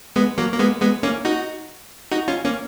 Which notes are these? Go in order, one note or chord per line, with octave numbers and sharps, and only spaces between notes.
G#3 B3
F#3 A#3
A#3
G#3 B3
G#3 B3
A#3 C#4
D#4 F#4
D#4 F#4
C#4 F4
A#3 C#4